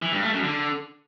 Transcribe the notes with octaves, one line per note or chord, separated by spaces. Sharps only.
E3
G2
A3
F#2
D3